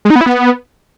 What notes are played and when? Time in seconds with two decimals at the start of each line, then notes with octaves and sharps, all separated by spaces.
0.05 G#3
0.10 D#4
0.16 B3
0.21 E4
0.26 B3